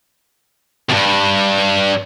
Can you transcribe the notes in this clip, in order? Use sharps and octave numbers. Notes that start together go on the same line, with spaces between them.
E2 G2